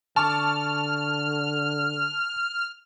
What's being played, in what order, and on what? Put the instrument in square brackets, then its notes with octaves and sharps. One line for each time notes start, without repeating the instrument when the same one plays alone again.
[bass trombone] D3 [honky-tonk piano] A5 C#6 D6 [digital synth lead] F6